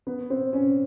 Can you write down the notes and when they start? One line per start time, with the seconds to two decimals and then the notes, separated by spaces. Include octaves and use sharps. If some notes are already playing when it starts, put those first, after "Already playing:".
0.07 B3
0.30 C4
0.53 C#4